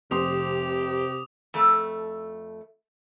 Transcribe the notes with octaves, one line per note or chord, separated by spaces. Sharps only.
F1 C3 G4 C5 C6 D6 D#6 F7
F2 A3